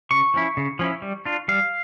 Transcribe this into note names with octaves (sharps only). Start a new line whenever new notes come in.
C#3 C#6
F3 C#4 E4
C#3
F3 C#4 E4
G3
D4 F4
G3 F5